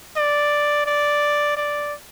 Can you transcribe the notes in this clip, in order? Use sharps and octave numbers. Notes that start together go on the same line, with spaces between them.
D5
D5
D5